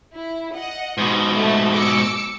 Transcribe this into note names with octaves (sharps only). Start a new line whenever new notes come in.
E4
D#5 F#5
G#2 B2
A3 A5
D6 E6 C#7